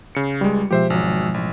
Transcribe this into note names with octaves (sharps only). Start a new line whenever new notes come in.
C#3 C#7
C#2 G3 G#3
B2 F3 G#3 G4 C5 E5
G#1 F#3
A1